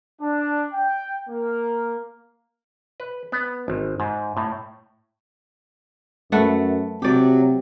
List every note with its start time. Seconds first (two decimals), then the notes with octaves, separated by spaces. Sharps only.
0.20 D4
0.73 G5
1.28 A#3
3.00 B4
3.32 B3
3.68 G#1
4.00 G#2
4.37 A2
6.32 F#2 A3 B4 F#5
7.02 C3 F#3 G4 D5